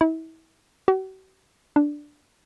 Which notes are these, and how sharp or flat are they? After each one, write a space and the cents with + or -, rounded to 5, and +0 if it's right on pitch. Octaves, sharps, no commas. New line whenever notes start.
E4 -35
F#4 +45
D4 +0